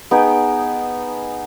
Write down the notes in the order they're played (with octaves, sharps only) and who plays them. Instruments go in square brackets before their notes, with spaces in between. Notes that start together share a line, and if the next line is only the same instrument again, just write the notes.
[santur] B3 D#4 G#4 G5